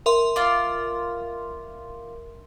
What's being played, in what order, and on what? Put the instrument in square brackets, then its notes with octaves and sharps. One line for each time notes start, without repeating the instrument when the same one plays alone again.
[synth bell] A#4 E5 C6
[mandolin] F4 D5